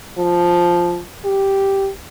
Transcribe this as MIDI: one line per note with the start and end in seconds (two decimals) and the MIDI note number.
0.18 1.01 53
1.25 1.89 67